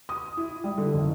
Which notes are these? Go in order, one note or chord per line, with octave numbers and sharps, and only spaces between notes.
D#6
E4
G3
D3
F#1